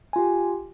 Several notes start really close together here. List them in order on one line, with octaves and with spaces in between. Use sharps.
G#5 F4 G4